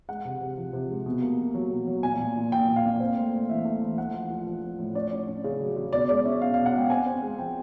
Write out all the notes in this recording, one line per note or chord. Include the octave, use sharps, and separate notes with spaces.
G#3 F#5
C3
C3
F3
C3
G#3
B2
A#3
B2
F#3
B2
F#3
A#2 G#5
A#2
A#2
A#2 G5
A#2
F5
A#2
C4
A3
A3
E3 E5
A3
E3
A3 F#5
F3
F3
F3
F3
A2
C#4 D5
C#4
C#4
C#3
F#3
C#3
B2 D5
G#3 D5
C#4 E5
B2 F5
B2 F5
F#5
G#3 G5
C4 G#5
C4
G#3
F3 G5